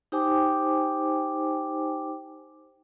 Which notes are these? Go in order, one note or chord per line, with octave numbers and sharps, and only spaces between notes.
D#4 G4 C5 G5 G#5 D6